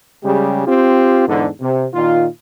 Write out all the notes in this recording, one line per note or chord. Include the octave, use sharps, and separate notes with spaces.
C#3 G3 G#3 G4
C4 F4 G4
E2 G#2 D3
C3
A#2 D#3 F4